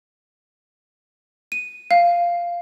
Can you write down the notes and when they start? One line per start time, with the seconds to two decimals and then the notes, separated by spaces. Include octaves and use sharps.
1.52 D#7
1.91 F5